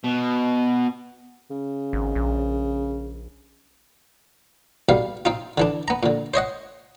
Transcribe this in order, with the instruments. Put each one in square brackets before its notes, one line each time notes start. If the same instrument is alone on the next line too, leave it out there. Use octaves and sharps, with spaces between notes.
[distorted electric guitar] B2
[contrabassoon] C#3
[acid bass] G#1
A#1
[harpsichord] B1 B2 G3 F5
C4 D#4 F4
D3 E3 D4
B3 A#5
A#2 D3
C5 C#5 D#5 F#5